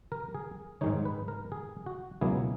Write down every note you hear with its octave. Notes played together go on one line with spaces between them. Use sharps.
A#4
G#4
G#2 D#3 G#3 D#4 C#5
B4
A#4
G#4
F#4
C#2 B2 F#3 A#3 E4 G#4